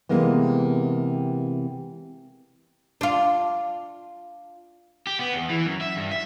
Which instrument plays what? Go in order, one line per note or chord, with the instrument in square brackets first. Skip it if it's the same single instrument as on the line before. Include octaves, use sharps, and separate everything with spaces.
[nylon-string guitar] C3 E3 G#3 A#3 B3
[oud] D4 F4
[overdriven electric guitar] G4
B3
E2
E3
F#2
E5
G2
E5